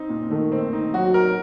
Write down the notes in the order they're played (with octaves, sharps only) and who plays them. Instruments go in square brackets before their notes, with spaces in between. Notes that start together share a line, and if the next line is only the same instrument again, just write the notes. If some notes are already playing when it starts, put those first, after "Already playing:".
Already playing: [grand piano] C4 D#4
A#2
[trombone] D#3 [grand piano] A3
[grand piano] C4
D#4
[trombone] F#3 [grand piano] F#4
[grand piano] A#4